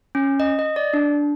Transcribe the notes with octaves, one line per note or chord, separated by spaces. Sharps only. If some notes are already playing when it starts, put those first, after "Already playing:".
C#4
D#5
D#5
D5
D4